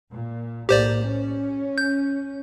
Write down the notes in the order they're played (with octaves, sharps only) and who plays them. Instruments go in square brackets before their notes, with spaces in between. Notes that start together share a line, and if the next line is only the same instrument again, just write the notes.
[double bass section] A#2
[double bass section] B1 A2 A#3 [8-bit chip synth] G4 C5 D5
[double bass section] C#4
[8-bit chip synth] G6